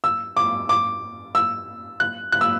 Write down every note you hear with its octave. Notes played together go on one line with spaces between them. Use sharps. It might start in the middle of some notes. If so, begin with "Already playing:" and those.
E6
D6
D6
E6
F#6
F#6
E6